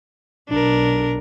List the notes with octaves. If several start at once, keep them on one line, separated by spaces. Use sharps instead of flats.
B1 D4 A#4